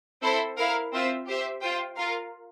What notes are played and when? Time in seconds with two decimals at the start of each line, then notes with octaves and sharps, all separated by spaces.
0.22 C4 E4 A4 C5
0.57 E4 A#4 F5
0.92 C4 F4 C5 E5
1.27 G4 C5 E5
1.61 F4 C5 G5
1.96 F4 A#4 F5